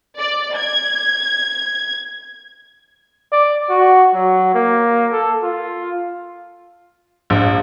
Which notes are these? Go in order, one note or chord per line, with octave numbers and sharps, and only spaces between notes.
D5
G#6
D5
F#4
F#3
A#3
A4
F4
A#1